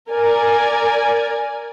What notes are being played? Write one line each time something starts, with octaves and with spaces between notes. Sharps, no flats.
A#4 D5 G#5